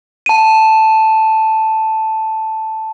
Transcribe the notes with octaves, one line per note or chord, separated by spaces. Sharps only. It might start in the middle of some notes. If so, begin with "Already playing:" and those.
A5 D#7